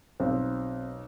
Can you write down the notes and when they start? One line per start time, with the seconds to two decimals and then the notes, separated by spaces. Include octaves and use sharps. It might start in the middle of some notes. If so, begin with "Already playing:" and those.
0.20 B1 C4